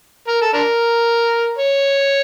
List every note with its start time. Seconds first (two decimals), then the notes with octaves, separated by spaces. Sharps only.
0.28 A#4
0.42 A4
0.54 D4 A#4
1.58 C#5